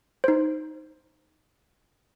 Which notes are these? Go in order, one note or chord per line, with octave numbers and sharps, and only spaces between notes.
D#4 C5